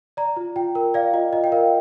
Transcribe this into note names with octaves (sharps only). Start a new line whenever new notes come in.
D5 A#5
F4
F4 G5
A#4
D5 F5
F4 D#5
F4 D#5
G5
A#4 F5